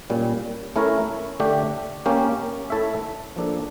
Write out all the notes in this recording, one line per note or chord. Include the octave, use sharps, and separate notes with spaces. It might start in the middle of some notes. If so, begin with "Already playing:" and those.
A#2 G3 C#4
A3 C#4 E4 A#4 C#5
D3 A3 D4 G4
A#3 C#4 G4
A3 E4 A4 C#5 E5
F3 A#3 D4 A4